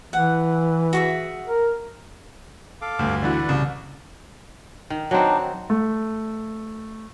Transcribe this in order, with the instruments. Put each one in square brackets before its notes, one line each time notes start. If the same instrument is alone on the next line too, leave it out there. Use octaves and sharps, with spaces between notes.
[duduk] E3 [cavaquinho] F#5
[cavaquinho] F#4 G#4 E5
[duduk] A#4
[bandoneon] A4 F5 D6
[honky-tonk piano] G1 [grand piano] D2
[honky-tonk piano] D3 E3 F#4 [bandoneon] B4 D5
[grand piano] C2 [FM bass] C#3
[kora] D#3
[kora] F#3 C4 [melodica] D4 D#4
[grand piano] A3